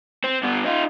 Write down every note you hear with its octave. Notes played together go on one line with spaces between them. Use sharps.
C4
G2 B3
D#4 F4